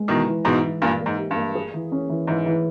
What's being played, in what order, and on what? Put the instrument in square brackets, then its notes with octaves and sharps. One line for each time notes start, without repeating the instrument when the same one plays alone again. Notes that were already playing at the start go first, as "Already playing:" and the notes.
Already playing: [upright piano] G#3
[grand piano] B2 D#3 [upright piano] E3
[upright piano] E3
[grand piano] G#2 B2 [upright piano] E3
[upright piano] E4
[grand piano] G2 A#2 [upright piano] A#3
[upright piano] A#3
[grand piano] G#2
[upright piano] G4
[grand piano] G2
[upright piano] A#3
G#4
E3
C#4
E3
[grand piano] G#2 [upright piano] E3
[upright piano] E3